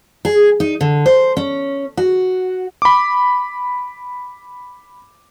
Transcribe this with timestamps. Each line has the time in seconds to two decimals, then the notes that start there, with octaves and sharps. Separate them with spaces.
0.25 G#4
0.60 D#4
0.81 D3
1.06 C5
1.37 C#4
1.97 F#4
2.82 B5 D6